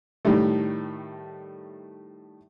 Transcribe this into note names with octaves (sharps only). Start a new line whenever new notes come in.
A2 D#3 G3 A3